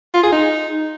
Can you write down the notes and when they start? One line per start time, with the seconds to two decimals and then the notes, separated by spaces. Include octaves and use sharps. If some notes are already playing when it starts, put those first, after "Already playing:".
0.14 F4
0.23 G#4
0.32 D#4